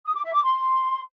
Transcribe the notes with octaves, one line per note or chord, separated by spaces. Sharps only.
D#6
D6
E5
D6
C6